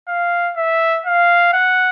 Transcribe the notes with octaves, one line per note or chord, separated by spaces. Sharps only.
F5
E5
F5
F#5